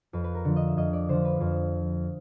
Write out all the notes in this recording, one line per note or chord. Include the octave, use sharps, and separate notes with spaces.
F2 B4
B4
A#4
D3 F3
D#5
E5
F2 D#5
D5
D3 F3 C5
B4
F2 C5